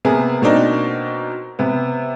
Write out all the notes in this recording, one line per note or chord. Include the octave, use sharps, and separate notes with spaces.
C3 A#3 B3 G#4
B2 A#3 C4 D4 D#4
C3 B3